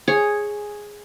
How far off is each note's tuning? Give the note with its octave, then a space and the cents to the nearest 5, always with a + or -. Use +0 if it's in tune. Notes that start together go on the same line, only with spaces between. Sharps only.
G#4 +0 C#5 -5